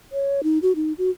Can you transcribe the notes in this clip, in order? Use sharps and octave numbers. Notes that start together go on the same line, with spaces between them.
C#5
D#4
F#4
D#4
F#4